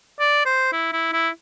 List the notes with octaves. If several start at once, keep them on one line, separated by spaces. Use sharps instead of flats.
D5
C5
E4
E4
E4